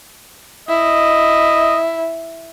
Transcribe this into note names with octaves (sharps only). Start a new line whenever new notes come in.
E4 D#5